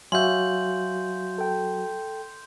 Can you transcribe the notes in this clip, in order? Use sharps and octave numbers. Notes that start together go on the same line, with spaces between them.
F#3 F#4 E5 F5 G#5 C6 G6
A4 G5